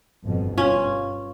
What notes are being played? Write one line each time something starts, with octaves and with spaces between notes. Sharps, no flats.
G1 F2 B2
G2 C#4 F4